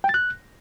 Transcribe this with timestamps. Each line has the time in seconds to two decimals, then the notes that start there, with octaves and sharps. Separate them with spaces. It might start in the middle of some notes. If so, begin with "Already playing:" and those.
0.04 G5
0.09 A6
0.14 F#6